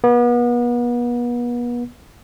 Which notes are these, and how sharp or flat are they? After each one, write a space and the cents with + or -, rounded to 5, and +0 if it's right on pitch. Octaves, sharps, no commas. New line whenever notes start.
B3 -35